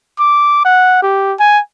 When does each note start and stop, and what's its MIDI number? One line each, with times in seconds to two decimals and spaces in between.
0.19 0.64 86
0.65 1.02 78
1.02 1.34 67
1.40 1.60 80